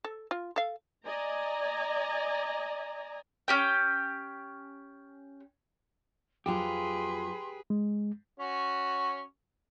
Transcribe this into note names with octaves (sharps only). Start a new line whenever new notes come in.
A4
F4
A4 F5
D5 D#5 G#5 A#5
C#4 G4 G5
F2 F#3 F4 G4 G#4 B4 C6
G#3
C#4 F#4 C#5